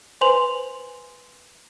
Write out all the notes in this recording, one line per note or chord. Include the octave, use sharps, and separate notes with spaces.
B4 C5 G#5 C6 F7 F#7